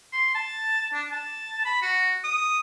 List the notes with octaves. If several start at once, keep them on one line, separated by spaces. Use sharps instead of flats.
C6
A5
D4
A5
B5
F#4
D#6